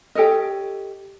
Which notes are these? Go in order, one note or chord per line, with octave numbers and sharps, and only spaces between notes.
G4 A4 C#5 D#5